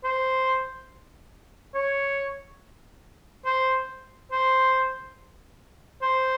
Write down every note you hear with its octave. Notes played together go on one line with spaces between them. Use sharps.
C5
C#5
C5
C5
C5